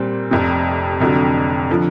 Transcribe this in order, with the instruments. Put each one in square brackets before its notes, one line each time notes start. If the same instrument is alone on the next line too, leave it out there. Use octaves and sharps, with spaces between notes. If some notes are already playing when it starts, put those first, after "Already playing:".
Already playing: [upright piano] A#2 G3 C4
F1 F2 C3
F1 F2 D3 F#3
D3 F3